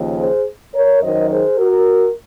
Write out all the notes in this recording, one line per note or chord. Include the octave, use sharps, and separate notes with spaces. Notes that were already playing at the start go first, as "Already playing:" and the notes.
Already playing: D#2 C#3 F3
G#4 C5
A#4 C#5
F#2 D#3 F#3 C5 D#5
G#4 C5
F#4 A#4